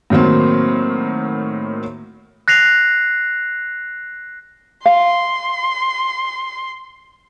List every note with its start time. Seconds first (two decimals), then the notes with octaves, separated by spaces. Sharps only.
0.10 A2 D#3 F#3 A#3 C4
2.48 F#6 A#6 C7 F7
4.85 F5 C6